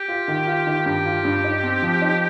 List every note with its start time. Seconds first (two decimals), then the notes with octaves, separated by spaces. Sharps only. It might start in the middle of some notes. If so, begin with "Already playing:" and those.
Already playing: G4
0.08 F4
0.28 D#3
0.47 F4
0.67 D#3
0.86 G2 G4
1.05 F4
1.25 G2
1.44 D#4
1.63 C4
1.82 F3
2.02 D#4